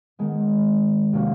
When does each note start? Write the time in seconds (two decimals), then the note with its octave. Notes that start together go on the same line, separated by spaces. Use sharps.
0.19 D#3 G#3 B3
1.13 C3 F3 A#3 C#4 F#4